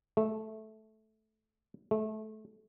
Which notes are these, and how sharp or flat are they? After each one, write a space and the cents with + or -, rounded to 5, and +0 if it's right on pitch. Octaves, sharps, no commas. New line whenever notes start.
A3 -10
A3 -20